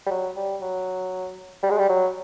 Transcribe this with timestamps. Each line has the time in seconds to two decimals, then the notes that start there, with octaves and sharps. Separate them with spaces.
0.06 G3
0.11 F#3
0.36 G3
0.62 F#3
1.63 G3
1.70 G#3
1.78 G3
1.89 F#3